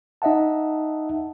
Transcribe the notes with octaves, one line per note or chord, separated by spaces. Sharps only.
D#4 D#5 E5 F#5 A5